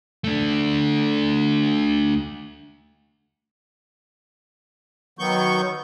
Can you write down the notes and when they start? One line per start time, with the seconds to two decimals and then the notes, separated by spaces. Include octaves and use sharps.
0.24 A3 D4
5.19 D#3 F#3 B3 C#6 G6